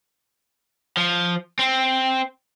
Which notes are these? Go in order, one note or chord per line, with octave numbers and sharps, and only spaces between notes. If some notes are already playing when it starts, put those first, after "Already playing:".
F3
C4